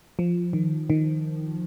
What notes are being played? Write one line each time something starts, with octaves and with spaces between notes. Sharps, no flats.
F3
D#3
D#3